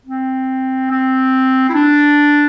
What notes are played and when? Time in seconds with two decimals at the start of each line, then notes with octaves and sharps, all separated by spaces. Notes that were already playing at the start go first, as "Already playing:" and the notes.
0.06 C4
0.91 C4
1.70 E4
1.74 D4